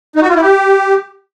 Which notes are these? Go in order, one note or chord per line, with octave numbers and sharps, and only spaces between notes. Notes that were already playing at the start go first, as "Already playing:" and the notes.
D#4
F#4
F4
E4
G4